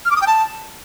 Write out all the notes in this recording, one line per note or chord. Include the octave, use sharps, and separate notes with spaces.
F6
D6
D#6
G5
A5